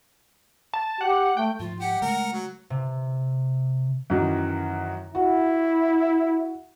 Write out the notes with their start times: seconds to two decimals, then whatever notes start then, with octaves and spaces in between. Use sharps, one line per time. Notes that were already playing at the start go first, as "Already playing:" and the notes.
0.74 A5
1.01 G4 F#5
1.37 A3 G5
1.60 G#2 F3 F4
1.80 G4 F#5
2.01 C#3 G#3 A3 A#4
2.32 F#3
2.70 C3
4.10 F#2 D#3 E3
5.15 E4 F#4